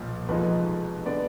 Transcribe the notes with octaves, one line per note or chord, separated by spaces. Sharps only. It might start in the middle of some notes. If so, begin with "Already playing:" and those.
Already playing: B1 A#2 F3
F1 F2 F3 G#3 D#4 B4
D3 G#3 B3 D5